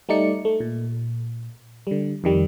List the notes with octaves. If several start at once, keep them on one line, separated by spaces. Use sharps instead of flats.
G3 A3 D#4 D5 C#7
A3
A#2
D3 G3
F2 D#3 G3